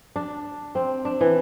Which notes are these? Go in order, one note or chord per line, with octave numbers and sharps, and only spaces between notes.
D4
C4
D4
E3